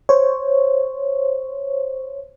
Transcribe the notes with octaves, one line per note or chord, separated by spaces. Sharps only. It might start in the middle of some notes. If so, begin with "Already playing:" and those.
C5 C#5